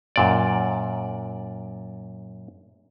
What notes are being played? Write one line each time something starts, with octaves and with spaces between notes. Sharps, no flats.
F#2 A#2 D5